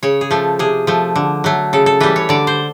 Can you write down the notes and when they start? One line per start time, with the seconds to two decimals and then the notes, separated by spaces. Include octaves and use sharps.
0.03 C#3 C#5
0.21 G#4
0.31 F3 A3
0.59 C3 G#4
0.87 F3 A3
1.16 D3
1.44 F#3 A3
1.73 C#3 A4
1.86 A4
2.00 E3 G3 B4
2.16 C#5
2.29 D3 D5
2.47 C5